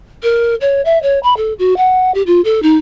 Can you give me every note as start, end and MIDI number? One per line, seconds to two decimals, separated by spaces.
0.23 0.55 70
0.61 0.81 73
0.85 1.00 76
1.02 1.19 73
1.23 1.36 83
1.37 1.53 69
1.59 1.77 66
1.77 2.13 78
2.14 2.22 67
2.27 2.41 65
2.44 2.62 69
2.62 2.77 63